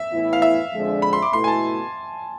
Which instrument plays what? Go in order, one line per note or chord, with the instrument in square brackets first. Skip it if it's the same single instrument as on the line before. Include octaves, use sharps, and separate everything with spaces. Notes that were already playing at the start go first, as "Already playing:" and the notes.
Already playing: [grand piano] E5
[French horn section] A2 E3 B3 E4
[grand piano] F5
E5
[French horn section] F2 D3 F3 G#3 D4
[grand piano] B5
C6
D6
[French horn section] B2 A3 E4 [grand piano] C6
[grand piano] G#5
A5